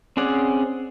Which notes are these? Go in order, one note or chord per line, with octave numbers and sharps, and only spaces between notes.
C4 C#4 G#4 D5 F#5